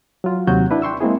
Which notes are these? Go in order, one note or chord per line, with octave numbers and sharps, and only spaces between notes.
F#3 F4
D#2 C3 F#3 F#4 C#5 G6
D4 E4 B4
G5 C6 C#6 E6
G#3 A#3 C4 E4 G#4